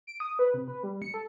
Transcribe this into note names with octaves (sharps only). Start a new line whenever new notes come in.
D7
D#6
B4
C3
B4
G3
C#7
A4